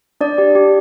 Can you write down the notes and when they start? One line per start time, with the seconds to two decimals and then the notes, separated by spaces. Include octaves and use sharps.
0.21 D4 D5
0.38 G4
0.55 G4